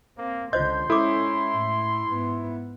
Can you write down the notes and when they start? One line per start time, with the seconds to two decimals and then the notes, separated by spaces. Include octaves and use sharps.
0.18 A#3 C4
0.53 C#2 D3 F4 C5 D#5 C6 G6
0.90 G#3 C#4 E4 A4 D6
1.53 A2
2.07 G#2 B3